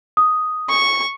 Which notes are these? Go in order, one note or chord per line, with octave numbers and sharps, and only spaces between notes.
D#6
C#6